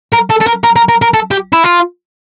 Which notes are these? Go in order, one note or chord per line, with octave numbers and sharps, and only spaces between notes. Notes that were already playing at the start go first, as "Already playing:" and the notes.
A#4
A4
A4
A#4
A#4
A#4
A#4
A#4
A4
G4
E4
F4